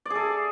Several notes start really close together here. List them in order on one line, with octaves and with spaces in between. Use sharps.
D5 G#4 A4